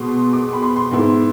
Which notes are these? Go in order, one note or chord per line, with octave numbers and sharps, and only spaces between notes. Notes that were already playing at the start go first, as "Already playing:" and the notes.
Already playing: B2 G#3 B3 C6
D6
B5
C6
C6
G#2 G#3 B3 E4